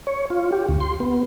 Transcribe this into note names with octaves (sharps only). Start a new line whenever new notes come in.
C#5
F4
G4
D2
C6
B3